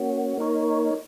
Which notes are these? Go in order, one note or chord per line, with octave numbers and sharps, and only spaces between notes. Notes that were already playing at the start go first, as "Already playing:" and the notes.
Already playing: A#3 C#4 F#4
A#3 D#4 A#4 C#5